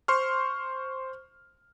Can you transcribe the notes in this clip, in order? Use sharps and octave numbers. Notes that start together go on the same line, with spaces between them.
C5 C6 C#6 F6